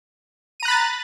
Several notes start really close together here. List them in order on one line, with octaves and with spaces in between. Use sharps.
D#7 A#5 F#6 B5 A6